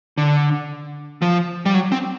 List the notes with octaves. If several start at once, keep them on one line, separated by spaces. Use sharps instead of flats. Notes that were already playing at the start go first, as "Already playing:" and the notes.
D3
F3
G3
F#3
C4